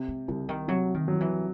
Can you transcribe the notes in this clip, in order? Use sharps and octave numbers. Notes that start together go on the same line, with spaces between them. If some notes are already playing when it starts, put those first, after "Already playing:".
Already playing: C3
G#3
C2 C#3
D#3
C3 F#3
D#3
F#3
E3